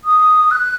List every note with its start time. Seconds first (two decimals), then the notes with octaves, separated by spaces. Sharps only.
0.05 D#6
0.51 F#6